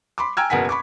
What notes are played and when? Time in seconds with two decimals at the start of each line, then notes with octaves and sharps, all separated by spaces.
0.18 B5 C6 D6
0.37 G5 G#5 A#5 E6 F6 G#6
0.50 F#1 B2 A#4 F#5 G#5 B6
0.69 B5 C#6 D6